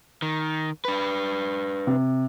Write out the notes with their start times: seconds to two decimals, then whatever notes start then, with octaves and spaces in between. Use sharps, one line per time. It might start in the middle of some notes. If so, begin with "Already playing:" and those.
0.22 D#3
0.85 D4 B4
1.87 C3